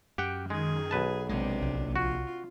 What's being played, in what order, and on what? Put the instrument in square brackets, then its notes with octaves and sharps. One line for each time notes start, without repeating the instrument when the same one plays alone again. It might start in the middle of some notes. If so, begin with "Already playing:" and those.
[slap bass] F#2 [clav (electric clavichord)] G4 F#5 G5
[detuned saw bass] D#3 [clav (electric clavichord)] G#3 [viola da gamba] G#4
[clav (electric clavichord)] B1 B4 A5
[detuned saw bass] A#1 [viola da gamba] C3 D4 [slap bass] G#3
[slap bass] C2
[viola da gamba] F4 [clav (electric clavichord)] F#4